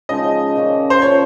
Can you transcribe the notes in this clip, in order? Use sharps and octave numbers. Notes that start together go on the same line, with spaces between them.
C#3 F3 G#3 D#4 D#5
A#2 F3 A#3 C#4
C5
A#2 F3 A#3 C#4 C#5